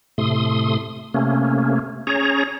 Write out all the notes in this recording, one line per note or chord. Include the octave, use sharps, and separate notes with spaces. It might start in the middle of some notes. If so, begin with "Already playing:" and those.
A2 C3 A3 C6 D#6
C3 A3 A#3 C#4
C#4 G#4 C#5 A#5